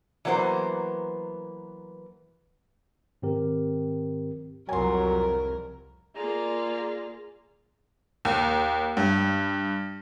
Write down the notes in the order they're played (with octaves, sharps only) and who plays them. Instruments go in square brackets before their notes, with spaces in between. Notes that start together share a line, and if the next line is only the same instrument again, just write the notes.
[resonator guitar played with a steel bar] E3 F#3 A#3 B3 C5
[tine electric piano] G#2 D#3 C4 G4 A#4
[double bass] C2 F2 [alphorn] F#3 [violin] A#4 [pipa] G#5 C6
[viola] A#3 F4 [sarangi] G#4 [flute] D5 [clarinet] A#5
[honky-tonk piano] D#2
G2